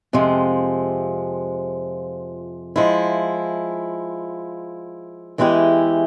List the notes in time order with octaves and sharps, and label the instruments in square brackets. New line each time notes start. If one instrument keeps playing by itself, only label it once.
[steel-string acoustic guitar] F2 C3 F3 G#3
F3 G#3 E4
E2 E3 G#3 E4 G4